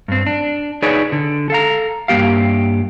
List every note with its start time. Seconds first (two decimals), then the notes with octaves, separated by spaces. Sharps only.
0.08 G2 C4
0.27 D4
0.82 D#4 G#4 B4 C#5 D5
1.12 D3
1.50 A4 F5 A#5
2.08 G2 G#3 A#3 G4 F5